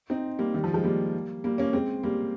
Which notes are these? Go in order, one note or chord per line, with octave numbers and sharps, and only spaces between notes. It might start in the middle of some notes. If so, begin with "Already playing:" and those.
C4 D#4
G3 A#3
D#3 G3
F3
F3 G#3
G3 A#3
G3 A#3
A#3 C#4
G#3 C4
G3 A#3